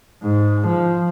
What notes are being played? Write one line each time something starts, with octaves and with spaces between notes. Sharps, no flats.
G#2
F3